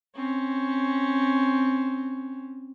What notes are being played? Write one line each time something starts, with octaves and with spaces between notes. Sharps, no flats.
C4 C#4